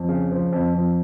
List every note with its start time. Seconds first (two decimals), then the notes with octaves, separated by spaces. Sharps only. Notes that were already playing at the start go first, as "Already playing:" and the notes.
Already playing: F2
0.09 C#3
0.31 F3
0.53 F2
0.74 F2